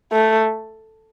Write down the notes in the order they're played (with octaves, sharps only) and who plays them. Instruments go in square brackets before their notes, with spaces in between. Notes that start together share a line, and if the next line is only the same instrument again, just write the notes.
[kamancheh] A3